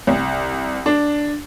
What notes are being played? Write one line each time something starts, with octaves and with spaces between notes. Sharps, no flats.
C2
D4